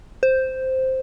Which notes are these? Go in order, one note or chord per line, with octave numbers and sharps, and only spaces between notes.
C5